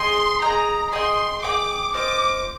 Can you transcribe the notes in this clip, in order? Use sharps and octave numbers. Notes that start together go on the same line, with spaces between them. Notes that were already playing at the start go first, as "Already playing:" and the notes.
Already playing: G#4 D#5 G5 C6
G#4 D#5 G5 A#5
G#4 D#5 G5 C6
G#4 D#5 G5 D6
F4 C5 D#5 D6